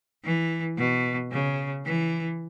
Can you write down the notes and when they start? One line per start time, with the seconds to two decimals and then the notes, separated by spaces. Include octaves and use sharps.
0.24 E3
0.77 B2
1.32 C#3
1.85 E3